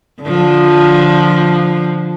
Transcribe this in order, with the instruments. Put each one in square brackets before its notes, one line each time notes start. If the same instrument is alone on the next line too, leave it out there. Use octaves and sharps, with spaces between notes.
[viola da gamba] D3 F3